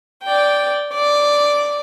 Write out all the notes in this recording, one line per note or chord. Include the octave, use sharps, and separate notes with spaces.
D5 G5
D5